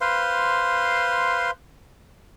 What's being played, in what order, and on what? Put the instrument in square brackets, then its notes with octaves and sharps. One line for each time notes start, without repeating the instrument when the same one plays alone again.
[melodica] B4 C5 F5 C6